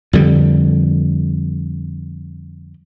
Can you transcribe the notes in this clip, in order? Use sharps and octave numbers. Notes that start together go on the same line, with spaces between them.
F2 D3 G3